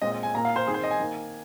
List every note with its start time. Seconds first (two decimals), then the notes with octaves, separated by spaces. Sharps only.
0.02 A#2 G#3 C4 D#5
0.12 D#5
0.23 G#5
0.34 A#2 A#3 A#5
0.45 F5
0.56 C5
0.66 D#3 C4 G#4
0.74 C5
0.83 D#5
0.91 G#5
1.00 D#3 A#3